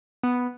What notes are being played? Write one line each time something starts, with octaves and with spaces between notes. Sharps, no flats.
B3